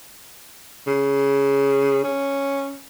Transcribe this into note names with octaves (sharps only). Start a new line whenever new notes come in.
C#3
C#4